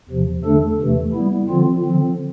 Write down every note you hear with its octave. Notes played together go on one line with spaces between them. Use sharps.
E2 C3 F3
E2 D3 A3 D4 A4
E2 C3 E3 A3
G3 B3 E4
D3 F3 C4 F4
D3 F3 C4